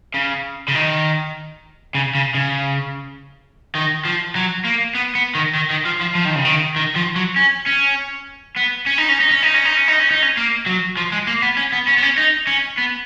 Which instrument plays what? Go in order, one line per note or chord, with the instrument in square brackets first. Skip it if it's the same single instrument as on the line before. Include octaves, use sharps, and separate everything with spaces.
[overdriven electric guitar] C#3
C#3
D#3
C#3
C#3
C#3
D#3
F3
F#3
A#3
B3
B3
D#3
D#3
D#3
F3
F3
F3
D#3
C#3
D#3
D#3
F3
F#3
C#4
C#4
B3
C#4
D#4
C#4
D#4
C#4
D#4
C#4
D#4
C#4
D#4
C#4
D#4
C#4
A#3
F#3
F3
G#3
A#3
B3
C#4
B3
C#4
B3
C#4
D#4
C#4
B3